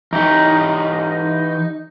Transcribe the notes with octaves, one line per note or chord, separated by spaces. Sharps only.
E3 D#4 G4